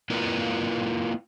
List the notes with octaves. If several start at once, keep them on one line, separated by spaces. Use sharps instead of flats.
A#3 E4 F4 A#4 B4 D5